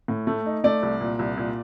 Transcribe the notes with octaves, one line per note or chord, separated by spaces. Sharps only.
A2
A3
D#4
A3 D5
C2
A#2
C2
A#2